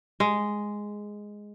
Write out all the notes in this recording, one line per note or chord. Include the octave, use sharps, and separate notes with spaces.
G#3